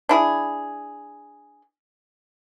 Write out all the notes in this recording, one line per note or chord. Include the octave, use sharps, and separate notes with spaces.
D4 E4 G#4